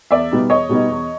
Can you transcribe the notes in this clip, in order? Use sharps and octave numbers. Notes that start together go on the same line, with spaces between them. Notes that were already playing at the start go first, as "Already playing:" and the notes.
E2 D5 E5
B2 G3 B3 D#4
E2 C#5 D#5
B2 G3 B3 D#4
E2